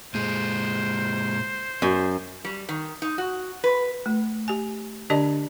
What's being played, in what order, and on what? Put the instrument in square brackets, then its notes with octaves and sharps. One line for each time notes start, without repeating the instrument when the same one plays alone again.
[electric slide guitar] A#2 G#3 [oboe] C5
[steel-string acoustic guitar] F#2
[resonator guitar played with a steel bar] G3
D#3
D#4
F#4
B4
[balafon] A3
G4 G#5
D3 D4 G4 D5 D#5 A5